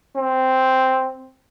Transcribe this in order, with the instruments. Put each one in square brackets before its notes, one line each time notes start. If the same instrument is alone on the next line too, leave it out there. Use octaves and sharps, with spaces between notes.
[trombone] C4